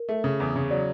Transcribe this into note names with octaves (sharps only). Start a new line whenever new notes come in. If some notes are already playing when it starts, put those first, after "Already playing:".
Already playing: A#4
A3
C#3
E2
C#3
F#3 D5